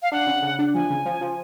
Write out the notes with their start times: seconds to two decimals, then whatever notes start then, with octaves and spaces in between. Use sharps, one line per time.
0.02 F5
0.12 D4 F#5
0.27 C#3
0.42 C#3
0.59 D4
0.74 F3 G#5
0.90 C#3
1.05 F3
1.21 F3